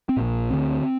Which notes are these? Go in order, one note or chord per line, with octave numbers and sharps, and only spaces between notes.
C4
A#1 A#2
D2 D3 C4